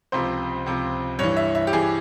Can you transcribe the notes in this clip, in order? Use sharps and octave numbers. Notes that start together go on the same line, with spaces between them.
C#2 C3 F3 C5
C#2 C3 F3
G2 E3 C#5
E5
E5
G4
E3 G#4